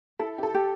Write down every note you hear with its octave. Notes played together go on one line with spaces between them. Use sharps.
E4 A4
G4
A4
G4